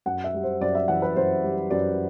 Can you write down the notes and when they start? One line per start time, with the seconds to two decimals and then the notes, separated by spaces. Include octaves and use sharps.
0.06 F#2 F#5
0.24 E5
0.34 G3
0.43 C5
0.61 F#2 D5
0.75 E5
0.88 E3 F#5
1.02 B4
1.16 F#2 C5
1.44 G3
1.71 F#2 D5